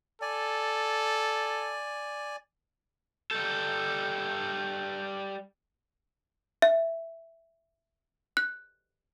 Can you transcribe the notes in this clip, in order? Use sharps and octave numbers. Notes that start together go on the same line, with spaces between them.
A4 D5 G#5
G3 A4 G6
E5
F#6